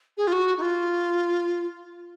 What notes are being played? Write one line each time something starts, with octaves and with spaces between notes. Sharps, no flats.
G#4
F4
F#4
D#4
F4